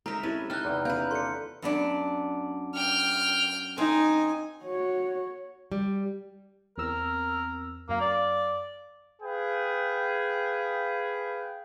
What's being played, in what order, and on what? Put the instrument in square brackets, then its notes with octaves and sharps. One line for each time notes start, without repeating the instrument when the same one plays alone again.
[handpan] G#3 [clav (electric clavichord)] C4 D#4 [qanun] A#4 E5 [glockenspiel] A#5
[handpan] C4 E4 G4 [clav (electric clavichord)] C#4 A4 D#5 [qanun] B4
[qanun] D#4 G5 [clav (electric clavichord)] A4 D#5 [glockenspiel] F6 F#6
[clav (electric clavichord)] E2 C3 E3
[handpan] B3 C#4 F5 [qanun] A#4 B4 [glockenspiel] G6
[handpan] F4 A4 D5 [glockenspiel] C6 C#7
[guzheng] F#2 B3 D4
[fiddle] G5 F6
[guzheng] C4 [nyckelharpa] D#4 [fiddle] G#5
[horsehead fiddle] F#4 C#5
[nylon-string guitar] G3
[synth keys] E2 C4 E6 [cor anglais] A#4
[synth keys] F#2 F5 [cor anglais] A#3
[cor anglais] D5
[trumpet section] G#4 B4 F5 G5